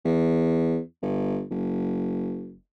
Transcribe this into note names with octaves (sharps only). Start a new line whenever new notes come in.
E2
G1
F#1